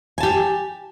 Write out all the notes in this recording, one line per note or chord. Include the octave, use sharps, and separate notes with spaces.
G4 G#5 A5